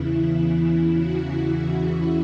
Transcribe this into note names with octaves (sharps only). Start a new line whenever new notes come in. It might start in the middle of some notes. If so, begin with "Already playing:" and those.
Already playing: E2 C#3 E3 E4
F#4